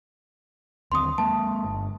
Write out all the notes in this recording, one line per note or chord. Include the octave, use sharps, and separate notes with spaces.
D#2 D3 C4 C6 D#6
G#3 A#3 A5
G1